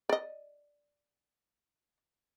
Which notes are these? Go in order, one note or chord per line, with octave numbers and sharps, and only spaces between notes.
D5 D#5